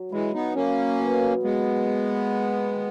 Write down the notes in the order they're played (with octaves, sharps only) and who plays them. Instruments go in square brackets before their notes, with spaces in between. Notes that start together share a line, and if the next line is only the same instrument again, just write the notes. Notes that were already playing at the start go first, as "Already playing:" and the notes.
Already playing: [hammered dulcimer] F#3
[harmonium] E3 G#3 [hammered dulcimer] E4
[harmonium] B3 D#4
[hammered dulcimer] F#3 [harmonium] A#3 C#4
[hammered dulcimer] B2
[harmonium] G#3 B3 [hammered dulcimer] A#3
[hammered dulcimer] E4
E4
D#3